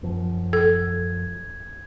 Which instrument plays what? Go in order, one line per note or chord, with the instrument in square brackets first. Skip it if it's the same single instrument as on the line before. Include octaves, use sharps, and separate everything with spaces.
[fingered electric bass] F#2 F3
[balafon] A4 [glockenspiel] G#6